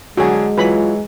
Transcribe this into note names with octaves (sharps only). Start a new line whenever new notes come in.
D3 F#3 G#3 F#4 G#4
E3 F#3 F4 B4 B5